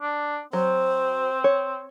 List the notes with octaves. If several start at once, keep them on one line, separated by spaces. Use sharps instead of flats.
D4
F#3 C4 C5
C#5